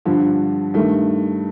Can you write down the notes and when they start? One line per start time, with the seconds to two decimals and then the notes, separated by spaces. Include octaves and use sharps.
0.05 G2 D3 F3
0.74 G2 D#3 A3